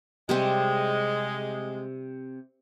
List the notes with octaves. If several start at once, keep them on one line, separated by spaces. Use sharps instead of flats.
C3 G3 G#3 C4